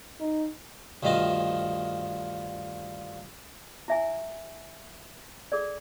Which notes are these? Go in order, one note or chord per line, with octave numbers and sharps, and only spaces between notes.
D#4
D2 G2 D#3 F3 D#5 A5
E4 E5 G#5
G#4 A4 D5